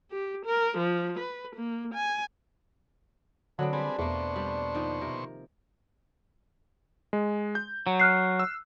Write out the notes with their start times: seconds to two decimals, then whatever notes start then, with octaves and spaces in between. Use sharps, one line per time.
0.11 G4
0.45 A#4
0.78 F3
1.19 B4
1.55 A#3
1.94 G#5
3.59 D3 F#3 B3 C4 D4
3.73 G3 C4 G#4 B4
3.99 E2 B2 A3 A#3 C5 C#6
4.36 G3
4.75 D#3 F3
5.01 C3 A#4
7.13 G#3
7.55 G6
7.87 F#3
8.00 F6 F#6 C7
8.39 E6